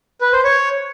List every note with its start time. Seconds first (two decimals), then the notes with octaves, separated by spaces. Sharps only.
0.21 B4
0.33 C5
0.44 C#5